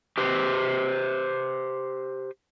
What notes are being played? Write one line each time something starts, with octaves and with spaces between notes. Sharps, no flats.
G4 B4 C5